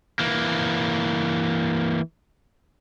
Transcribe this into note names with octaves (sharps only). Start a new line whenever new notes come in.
E3 A#3